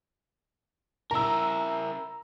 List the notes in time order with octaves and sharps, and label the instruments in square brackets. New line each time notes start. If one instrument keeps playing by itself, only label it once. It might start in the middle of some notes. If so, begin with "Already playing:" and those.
[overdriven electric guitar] E4 A#4 [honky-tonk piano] A#5 E6